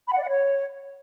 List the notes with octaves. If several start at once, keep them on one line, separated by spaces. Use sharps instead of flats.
B5
F#5
D5
F#5
C#5